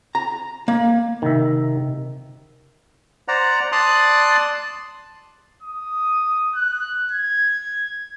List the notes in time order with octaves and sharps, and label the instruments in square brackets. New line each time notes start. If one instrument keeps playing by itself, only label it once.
[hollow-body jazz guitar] A#5
A#3
[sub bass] C3 [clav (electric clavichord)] D#3 E5
[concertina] C5 D5 F#5 A#5
D5 A5 C6 D#6 F#6
[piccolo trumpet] D#6
F#6
G#6